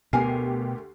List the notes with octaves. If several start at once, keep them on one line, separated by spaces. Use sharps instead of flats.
D2 B2 B3 G4 A#4 G#5 C7